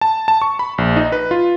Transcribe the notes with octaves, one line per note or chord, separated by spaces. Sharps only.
A5
A5
C#6
B5
A#1
D#4
B4
F4